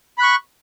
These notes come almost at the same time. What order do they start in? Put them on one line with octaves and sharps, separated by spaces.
B5 F#6 C#6